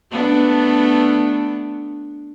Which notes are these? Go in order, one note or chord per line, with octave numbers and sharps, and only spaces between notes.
A3 B3 D4